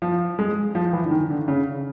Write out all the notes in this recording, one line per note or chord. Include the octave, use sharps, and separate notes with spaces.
F3
G#3
F3
E3
D3
D#3
D3
C#3